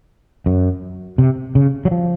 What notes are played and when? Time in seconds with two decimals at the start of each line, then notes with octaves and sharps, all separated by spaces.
0.46 F#2
1.18 C3
1.55 C#3
1.85 F#3
1.91 F3